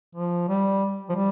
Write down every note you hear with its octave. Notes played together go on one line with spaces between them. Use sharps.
F3
G3
F3
G3